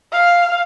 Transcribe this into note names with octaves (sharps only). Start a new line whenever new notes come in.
F5